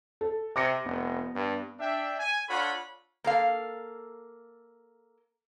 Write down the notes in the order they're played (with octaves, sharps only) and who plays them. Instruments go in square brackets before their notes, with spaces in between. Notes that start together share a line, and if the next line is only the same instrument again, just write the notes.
[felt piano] A4
[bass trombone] C3 [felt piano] D6 A#6 C#7
[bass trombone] F1 [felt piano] B3
[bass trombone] G2
[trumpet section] D4 E5 G5
G#5
D4 F4 A4 C#5 F#5 B5
[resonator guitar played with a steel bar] A#3 A4 F5